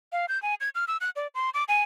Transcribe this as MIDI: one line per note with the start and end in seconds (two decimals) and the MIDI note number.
0.12 0.26 77
0.29 0.41 91
0.42 0.55 80
0.61 0.69 92
0.75 0.85 89
0.88 0.97 88
1.01 1.10 90
1.16 1.27 74
1.35 1.50 84
1.54 1.64 86
1.68 1.83 80